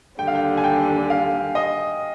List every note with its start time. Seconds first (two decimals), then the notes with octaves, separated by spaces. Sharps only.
0.19 D#2 D3 G3 G5
0.27 F5
0.35 G5
0.57 G#5
0.64 G5
1.10 F5
1.55 D#5